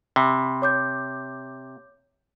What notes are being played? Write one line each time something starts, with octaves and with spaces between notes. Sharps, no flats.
C3 B5
C#5 D6 G6